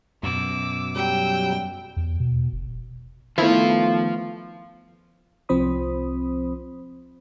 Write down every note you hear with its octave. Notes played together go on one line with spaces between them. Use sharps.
F#2 B2 D6 E6
F#3 G3 G5 E6
E2
B2
F1
D#3 F3 A3 B3 E4 F4 C5
C2 F3 C4 C5 B5 D#6